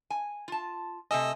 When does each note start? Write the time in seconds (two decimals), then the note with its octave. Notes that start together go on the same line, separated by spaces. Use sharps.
0.10 G#5
0.48 F4 A5
1.11 C3 A3 D#5 G#5 E6